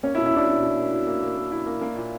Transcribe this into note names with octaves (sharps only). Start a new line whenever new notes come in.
A#3 C#4
E4
B2
E4
B2 D4
B2
B2
A#3
E4
A#3
A#3
A#3
E4
A#3
A#3
A#2